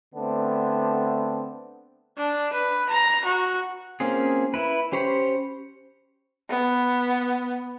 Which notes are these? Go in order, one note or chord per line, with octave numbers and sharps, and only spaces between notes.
D3 A3 B3 C4 D4
D4
B4
A#5
F#4
A#3 C4 C#4 F4 G#4
E4 B4
C#4 G4 C5 C#5 B5
B3